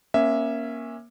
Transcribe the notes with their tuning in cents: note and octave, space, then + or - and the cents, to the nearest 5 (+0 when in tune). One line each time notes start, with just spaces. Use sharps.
A#3 +20 C#4 -15 E5 +0